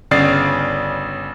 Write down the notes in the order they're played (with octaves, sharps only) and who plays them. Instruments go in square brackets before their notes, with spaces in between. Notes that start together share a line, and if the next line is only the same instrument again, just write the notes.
[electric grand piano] G1 C#3 C#4 D5 A6 C7